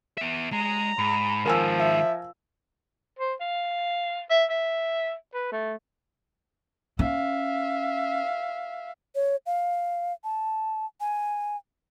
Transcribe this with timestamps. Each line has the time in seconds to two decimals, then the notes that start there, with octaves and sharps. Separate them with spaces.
0.18 B3 E5
0.52 G#3 A#5
0.98 G#2 B5
1.45 D#3 F3 G#3 A#4 G#5 E6
1.80 E5
3.19 C5
3.40 F5
4.30 E5
4.50 E5
5.34 B4
5.52 A3
6.99 C#4 E5 F5
9.15 C#5
9.46 F5
10.24 A5
11.01 G#5